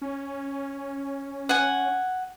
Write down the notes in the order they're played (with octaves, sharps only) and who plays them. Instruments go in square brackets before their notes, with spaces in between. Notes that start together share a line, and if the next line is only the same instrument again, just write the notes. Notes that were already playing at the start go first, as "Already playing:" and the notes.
[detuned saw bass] C#4
[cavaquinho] F#5 G#5